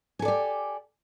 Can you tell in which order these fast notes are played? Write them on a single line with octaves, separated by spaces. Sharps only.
G#5 A4 D5 G4